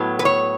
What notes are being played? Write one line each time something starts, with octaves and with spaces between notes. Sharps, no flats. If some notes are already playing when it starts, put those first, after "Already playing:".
Already playing: A2 F#3 B3
B4
C#5